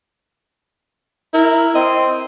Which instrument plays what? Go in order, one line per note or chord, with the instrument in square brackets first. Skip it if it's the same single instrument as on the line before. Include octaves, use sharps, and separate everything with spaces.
[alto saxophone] E4 [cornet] A#4
[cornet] C4 [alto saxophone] D#5